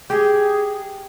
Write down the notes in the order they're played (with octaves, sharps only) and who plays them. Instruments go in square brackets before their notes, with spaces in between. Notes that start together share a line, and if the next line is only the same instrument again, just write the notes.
[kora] G4 [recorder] G#4